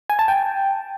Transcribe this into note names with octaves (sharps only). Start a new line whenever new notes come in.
G#5
A5
G5